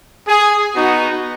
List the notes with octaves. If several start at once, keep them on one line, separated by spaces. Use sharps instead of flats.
G#4
B3 D#4 F#4